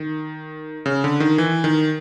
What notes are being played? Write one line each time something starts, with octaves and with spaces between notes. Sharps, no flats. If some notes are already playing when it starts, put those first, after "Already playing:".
Already playing: D#3
C#3
D3
D#3
E3
D#3